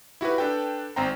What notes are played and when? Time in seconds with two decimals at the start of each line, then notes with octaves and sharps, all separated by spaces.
0.21 E4 F#4 G4 B4
0.38 D4 A4 B4 G5
0.96 G#1 C4 C5 G5 A#5